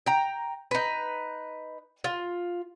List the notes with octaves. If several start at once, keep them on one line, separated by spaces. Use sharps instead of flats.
G5 A#5
D#4 B4
F4